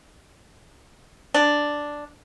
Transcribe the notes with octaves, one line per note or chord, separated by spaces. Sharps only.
D4